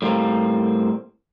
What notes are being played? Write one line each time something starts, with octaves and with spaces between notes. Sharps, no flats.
A2 G3 A#3 C4